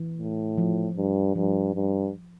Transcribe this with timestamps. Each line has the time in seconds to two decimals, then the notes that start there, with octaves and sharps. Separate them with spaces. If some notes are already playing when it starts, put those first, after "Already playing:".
Already playing: E3
0.18 A2
0.58 F3
0.96 G2
1.35 G2 F3
1.75 G2